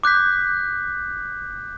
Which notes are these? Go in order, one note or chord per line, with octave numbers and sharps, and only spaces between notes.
D6 F#6 G6 B6